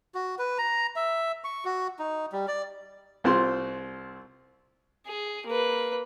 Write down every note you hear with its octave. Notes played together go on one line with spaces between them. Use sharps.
F#4
B4
A#5
E5
C#6
F#4
D#4
G3
D5
C2 C4 F4 C6
G#4
A#3 B4